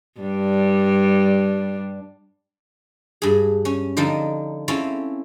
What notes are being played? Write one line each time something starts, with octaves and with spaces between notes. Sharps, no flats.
G2 G3 D4
G2 G#4
C#4
D3 F3 D4 D#4
C4 C#4 E4 F4 A4